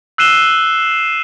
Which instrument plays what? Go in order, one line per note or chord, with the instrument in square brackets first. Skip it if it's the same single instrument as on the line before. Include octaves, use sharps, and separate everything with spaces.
[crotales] E6 F#6 C7 D#7 E7 G7